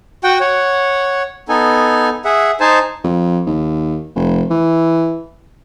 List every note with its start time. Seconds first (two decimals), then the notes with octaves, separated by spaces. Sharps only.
0.24 F#4 F#5 G5
0.40 C#5 F#5
1.49 B3 D#4 A4 G#5
2.25 G#4 E5 F#5
2.60 D#4 C5 G#5 A5
3.04 F2
3.46 D#2
4.15 F1
4.50 E3